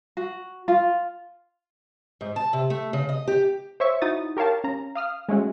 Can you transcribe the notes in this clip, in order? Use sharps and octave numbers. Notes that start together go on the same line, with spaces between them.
F#4
F4
G#2
A5
C3
A3
C#3
D#5
G4
C5 C#5 E5 C#6
D#4 E4 F#4 D#6 A6
G4 A#4 C#5 F5 A5
C#4 A#5
F5 D#6 F6
G#3 A3 C#4 F#4